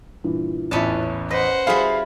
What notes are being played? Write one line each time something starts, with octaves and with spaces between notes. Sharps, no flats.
G2 A#2 E3
A1 E2 C#4 E4 B4 A5
B4 C5 D#5 F#5 A#6
G3 E4 F#4 G#4 F5